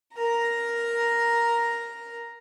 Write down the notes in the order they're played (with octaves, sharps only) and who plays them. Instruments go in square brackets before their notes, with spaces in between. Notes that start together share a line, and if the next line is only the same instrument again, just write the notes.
[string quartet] A#4 A#5